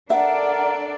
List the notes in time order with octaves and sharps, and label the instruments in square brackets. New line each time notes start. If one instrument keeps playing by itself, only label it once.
[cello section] D4 A4 D5 [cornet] A#4 [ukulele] E5 [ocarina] F#5